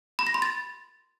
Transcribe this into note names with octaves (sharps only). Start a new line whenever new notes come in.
B5
A#6
C6
A6